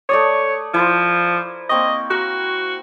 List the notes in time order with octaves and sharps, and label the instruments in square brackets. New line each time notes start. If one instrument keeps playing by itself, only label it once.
[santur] A3 D5 D#6 [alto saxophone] C#5
[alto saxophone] F3 [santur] E4 A#4 C5
[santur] A#3 C4 C#6 [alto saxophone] D#5
[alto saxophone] F#4 [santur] A#4